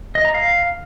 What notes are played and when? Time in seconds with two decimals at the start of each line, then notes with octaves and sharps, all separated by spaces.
0.15 D#5
0.25 A#5
0.34 F5